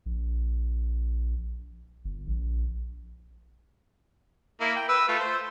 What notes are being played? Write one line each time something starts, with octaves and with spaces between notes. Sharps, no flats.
A#1
G1
A#1
A#3 E4
G5
B4 E6
A3 F4
C5